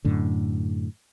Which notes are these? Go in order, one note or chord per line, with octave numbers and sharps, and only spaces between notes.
F#2 A2 D3